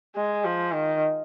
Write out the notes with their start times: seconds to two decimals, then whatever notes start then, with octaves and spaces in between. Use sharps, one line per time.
0.15 G#3
0.45 F3
0.74 D#3